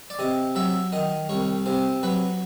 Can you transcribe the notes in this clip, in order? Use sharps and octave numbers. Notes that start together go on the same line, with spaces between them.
D5
C3 D#5
F#3 E5
D#3 D#5
C2 C#5
C3 C5
F#3 B4